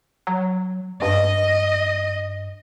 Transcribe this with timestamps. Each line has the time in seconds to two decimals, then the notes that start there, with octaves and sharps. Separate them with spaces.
0.27 F#3
1.02 G2 D#5